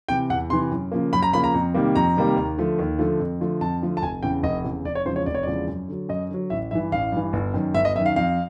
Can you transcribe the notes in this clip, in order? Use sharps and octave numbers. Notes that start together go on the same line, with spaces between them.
C3 E3 G5
E2 F#5
C3 E3 C6
F#2
C#3 F3 A#3
F#2 B5
A#5
C#3 F3 A#3 B5
A#5
F2
C3 D#3 G3 A#3
F2 A#5
C3 D#3 G3 A#3
D#2
D3 F3 A3
D#2
D3 F3 A3
F2
D3 F3 A3
F2 A5
D3 F3 A3
A5
F1 G#5
E2 C#3 G5
F1 D#5
E2 C#3
F1 D5
C#5
E2 C#3 F3 G#3 C5
C#5
F1 D5
C#5
E2 C#3 F3 G#3 D5
F#2
D3 F#3
F#2 D#5
D3 F#3
A1 E5
G2 E3 E5
A1 F5
G2 E3
G1
F#2 D#3
G1 E5
D#5
F#2 D#3 E5
F5
F2 F5